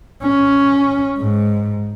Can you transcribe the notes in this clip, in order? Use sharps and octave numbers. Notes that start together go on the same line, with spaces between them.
C#4
G#2